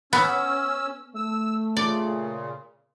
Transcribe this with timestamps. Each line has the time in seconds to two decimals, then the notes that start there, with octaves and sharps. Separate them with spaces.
0.13 B3 C#4 E6
1.15 A3 E6
1.77 A#2 C#3 D5